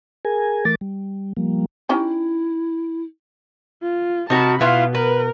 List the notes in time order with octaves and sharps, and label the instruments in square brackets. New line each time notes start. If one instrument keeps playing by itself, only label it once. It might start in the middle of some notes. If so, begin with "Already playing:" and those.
[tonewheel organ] G#4 A#4 G#5
E3 A3 A#4 D6 A6
G3
F3 G3 A#3
[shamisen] C#4 D#4 G4 [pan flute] E4
[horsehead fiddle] F4
[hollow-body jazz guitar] C3 [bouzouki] D#4 F#4 A#4 [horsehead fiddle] A5 B5
[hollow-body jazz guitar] B2 B3 [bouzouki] E4 F4 [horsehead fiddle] F5
[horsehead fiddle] A#4 [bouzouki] B4